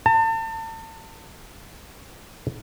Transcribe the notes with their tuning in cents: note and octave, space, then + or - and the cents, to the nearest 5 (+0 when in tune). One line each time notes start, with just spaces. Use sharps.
A5 +35